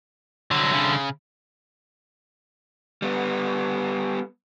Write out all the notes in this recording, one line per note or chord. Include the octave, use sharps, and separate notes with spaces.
C2 D3 F#3
C#3
G3 B3